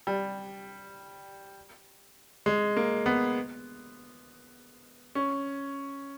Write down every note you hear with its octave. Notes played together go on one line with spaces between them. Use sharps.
G3
G#3
A#3
B3
C#4